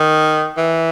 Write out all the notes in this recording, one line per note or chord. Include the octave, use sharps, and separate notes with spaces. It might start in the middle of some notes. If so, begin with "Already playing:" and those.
Already playing: D#3
E3